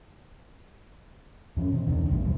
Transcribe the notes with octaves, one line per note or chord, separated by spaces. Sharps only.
G2 F3 C#4
B2 D#3 C4
E1 C#2 D#3 D4
A#1 F#2 B2 G3
D#1 C2 G2 F3